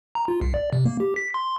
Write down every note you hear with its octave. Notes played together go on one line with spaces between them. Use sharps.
A#5
F4
C2
D5
C3
A#3
G4
B6
C6